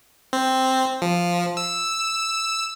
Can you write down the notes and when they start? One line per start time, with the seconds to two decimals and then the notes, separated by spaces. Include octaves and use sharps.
0.33 C4
1.02 F3
1.57 E6